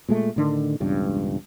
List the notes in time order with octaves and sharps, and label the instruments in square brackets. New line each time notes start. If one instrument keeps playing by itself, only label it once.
[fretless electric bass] A#2 G#3 A3
A2 D3 D#3
E1 C#2 G2